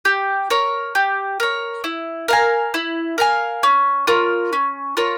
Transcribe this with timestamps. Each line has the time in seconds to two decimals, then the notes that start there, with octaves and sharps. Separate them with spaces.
0.05 G4
0.50 A#4 C#5
0.95 G4
1.40 A#4 C#5
1.84 E4
2.28 A#4 F5 G#5
2.74 E4
3.18 A#4 F5 G#5
3.63 C#4
4.07 F4 A#4 C#5
4.53 C#4
4.97 F4 A#4 C#5